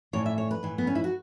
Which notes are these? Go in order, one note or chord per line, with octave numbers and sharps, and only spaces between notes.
A2 E3 C#5
E5
C#5
B4
A2 E3
B3
C#4
E4
F#4